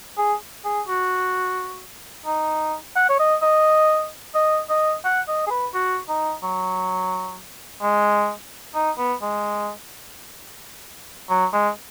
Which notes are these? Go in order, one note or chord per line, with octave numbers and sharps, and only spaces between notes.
G#4
G#4
F#4
D#4
F#5
C#5
D#5
D#5
D#5
D#5
F#5
D#5
G#4
B4
F#4
D#4
F#3
G#3
D#4
B3
G#3
F#3
G#3